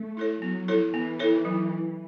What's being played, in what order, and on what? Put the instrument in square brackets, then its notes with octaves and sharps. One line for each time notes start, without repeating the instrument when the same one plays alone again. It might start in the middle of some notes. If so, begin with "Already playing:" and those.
Already playing: [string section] A3
[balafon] E4 A4 C#5
[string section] F#3 [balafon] B3
[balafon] E4 A4 C#5
[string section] E3 [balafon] B3
[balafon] E4 A4 C#5
F#3